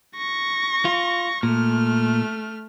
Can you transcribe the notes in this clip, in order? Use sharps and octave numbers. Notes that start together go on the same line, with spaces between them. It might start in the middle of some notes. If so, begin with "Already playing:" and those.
C#6 A#6
F4
A#2 A3 F6